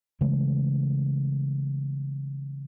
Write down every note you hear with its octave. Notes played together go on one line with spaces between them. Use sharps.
C#3 E3 G#3 A3